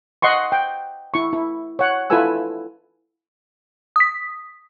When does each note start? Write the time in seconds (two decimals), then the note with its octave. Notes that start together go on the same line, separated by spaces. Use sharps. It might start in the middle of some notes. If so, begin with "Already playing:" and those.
0.22 D#5 F#5 C6 C#6
0.52 G5
1.14 E4 C#6
1.33 E4
1.79 C#5 F#5
2.10 E4 F4 A4 B4 G#5 E6
3.96 D#6 B6